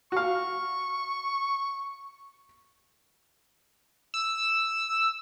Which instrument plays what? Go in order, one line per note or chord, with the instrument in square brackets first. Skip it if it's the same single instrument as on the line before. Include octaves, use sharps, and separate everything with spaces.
[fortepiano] F#4 F5 [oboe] C#6
[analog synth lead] E6